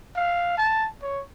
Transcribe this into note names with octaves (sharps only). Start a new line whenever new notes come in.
F5
A5
C#5